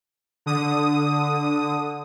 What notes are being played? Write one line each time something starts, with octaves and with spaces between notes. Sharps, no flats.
D3 D#6